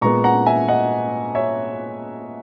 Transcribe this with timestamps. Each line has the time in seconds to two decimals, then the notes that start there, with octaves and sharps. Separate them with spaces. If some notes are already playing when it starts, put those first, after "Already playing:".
0.01 A#2 G#3 B3 A#5 C#6
0.24 F#5 A#5
0.46 E5 G#5
0.68 D#5 F#5
1.35 C#5 E5